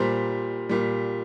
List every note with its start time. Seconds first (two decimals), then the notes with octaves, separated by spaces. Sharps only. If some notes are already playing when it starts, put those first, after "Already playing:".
Already playing: A#2 G3 C5
0.69 A#2 G3